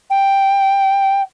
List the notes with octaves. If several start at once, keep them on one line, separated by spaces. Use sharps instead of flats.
G5